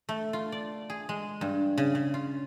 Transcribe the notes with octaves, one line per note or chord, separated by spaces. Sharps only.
A3
F4
D5
G#4
G#3
G2
C#3
C#3
F4